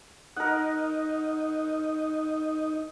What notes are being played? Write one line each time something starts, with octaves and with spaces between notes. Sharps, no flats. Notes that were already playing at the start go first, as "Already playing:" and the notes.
D#4 A#4 F#5